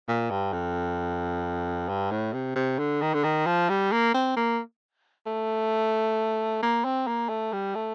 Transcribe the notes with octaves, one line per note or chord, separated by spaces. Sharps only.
A#2
G2
F2
G2
A2
C3
C3
D3
D#3
D3
D#3
F3
G3
A#3
C4
A#3
A3
A#3
C4
A#3
A3
G3
A3